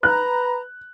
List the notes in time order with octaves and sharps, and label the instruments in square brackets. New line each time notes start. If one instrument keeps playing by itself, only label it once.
[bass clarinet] B4 [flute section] A#5 [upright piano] F#6